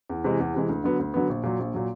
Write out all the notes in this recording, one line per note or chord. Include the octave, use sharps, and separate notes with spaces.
E2
C3 E3 G#3
E2
C3 E3 G#3
D2
D3 F#3 B3
D2
D3 F#3 B3
A#1
A#2 F#3
A#1
A#2 F#3